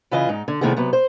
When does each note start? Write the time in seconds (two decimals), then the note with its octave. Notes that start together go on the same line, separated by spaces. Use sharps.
0.11 C#3 E3 F4 D#5 G#5
0.29 G#2 D#4
0.48 D3
0.61 C3 D#3 E3 A3 B3 G#4
0.76 C3 F#3 B3
0.93 C5